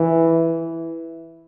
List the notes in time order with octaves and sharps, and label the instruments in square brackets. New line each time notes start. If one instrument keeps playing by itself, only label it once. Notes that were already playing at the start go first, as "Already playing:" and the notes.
Already playing: [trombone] E3